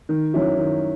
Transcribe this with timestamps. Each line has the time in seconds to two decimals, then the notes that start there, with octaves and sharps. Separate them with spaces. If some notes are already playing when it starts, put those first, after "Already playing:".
0.09 D#3
0.34 F#3 C#4 E4
0.58 D#3